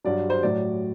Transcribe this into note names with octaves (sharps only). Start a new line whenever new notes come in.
G2 F#3 D5
C5
A2 F#3 D5